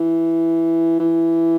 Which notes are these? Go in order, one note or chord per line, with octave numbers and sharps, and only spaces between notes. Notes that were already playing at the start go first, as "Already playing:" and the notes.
Already playing: E3
E3